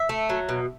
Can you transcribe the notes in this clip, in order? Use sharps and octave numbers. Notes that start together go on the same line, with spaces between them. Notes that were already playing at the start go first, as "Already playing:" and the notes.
Already playing: E5
A3
F#3
B2